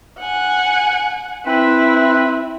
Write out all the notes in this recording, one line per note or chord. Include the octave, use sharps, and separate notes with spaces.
F#5 G#5
C4 E4 B4